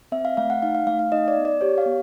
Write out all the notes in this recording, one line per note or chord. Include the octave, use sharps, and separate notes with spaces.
C4 E5
F5
A3 F5
F#5
D#4 F5
F5
A3 F5
F5
D#4 D#5
D5
B3
D5
G4 C#5
F5
B3